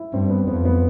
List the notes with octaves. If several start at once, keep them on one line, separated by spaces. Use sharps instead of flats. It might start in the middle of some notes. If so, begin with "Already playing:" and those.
Already playing: E4
G2 C4
B3
F2 B3
B3